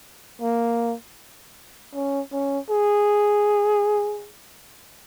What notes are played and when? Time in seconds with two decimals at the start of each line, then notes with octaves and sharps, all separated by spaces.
0.42 A#3
1.94 C#4
2.32 C#4
2.70 G#4